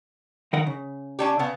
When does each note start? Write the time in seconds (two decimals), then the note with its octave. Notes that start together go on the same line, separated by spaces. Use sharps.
0.53 D#3 A#4 F#5
0.66 C#3
1.19 C#4 D4 G4
1.39 C#3 B3